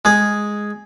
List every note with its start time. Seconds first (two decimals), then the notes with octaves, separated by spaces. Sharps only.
0.05 G#3 G#4